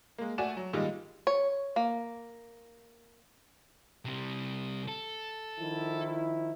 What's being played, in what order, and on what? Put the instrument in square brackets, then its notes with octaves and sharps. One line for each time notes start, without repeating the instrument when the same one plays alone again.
[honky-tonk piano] G#3 A#3
A3 F#4 D5 G#5 E7
F#3
A#2 D#3 G3 G#3 D#5
[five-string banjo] C#5
A#3
[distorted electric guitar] C3 G3
A4
[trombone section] D#3 F3 E4